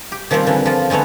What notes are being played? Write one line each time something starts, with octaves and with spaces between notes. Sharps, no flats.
G4
D#3 F3 G3 A#3 C4
D3 E3
F3 F4
D3 G#3 A3 B3 C#5